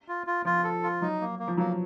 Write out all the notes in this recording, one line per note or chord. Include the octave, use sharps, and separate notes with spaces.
F4
F4
F3 F4
A4
F4
F#3 D#4
A#3
A#3
F3
F#3 A#3